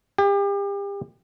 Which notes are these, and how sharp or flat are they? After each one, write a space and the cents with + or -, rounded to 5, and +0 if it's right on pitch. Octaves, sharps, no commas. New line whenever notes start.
G4 +35